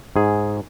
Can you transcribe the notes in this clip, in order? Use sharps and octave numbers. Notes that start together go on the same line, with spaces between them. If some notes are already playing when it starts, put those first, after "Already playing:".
G#2 G#4